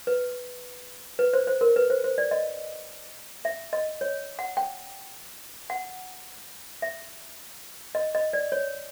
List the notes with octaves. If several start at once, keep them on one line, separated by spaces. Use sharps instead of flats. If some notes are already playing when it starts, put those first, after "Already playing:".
B4
B4
C5
C5
A#4
B4
C5
C5
D5
D#5
E5
D#5
C#5
F#5
G5
F#5
E5
D#5
D#5
D5
C#5